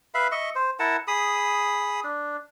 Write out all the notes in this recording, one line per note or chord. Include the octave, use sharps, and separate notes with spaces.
B4 E5 F5 B5
D#5 E5 C#6
C5
E4 A#4 F#5 A5
G#4 B5 D#6
D4